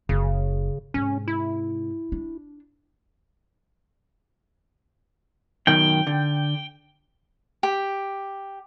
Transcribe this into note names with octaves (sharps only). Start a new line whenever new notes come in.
F#1 C#3
G#2 C3 C#4
E4
D4
F#2 B2 D#3 G5
D3
G4